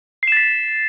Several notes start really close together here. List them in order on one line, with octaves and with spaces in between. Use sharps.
C7 E7 A6 B6